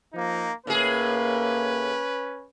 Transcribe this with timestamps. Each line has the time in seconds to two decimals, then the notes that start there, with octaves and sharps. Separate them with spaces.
0.14 F3 A#3 D#4
0.67 A2 A#3 C#4 G#4 B4